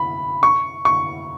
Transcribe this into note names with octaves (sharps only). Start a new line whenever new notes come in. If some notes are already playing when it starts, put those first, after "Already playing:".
Already playing: B5
C#6
C#6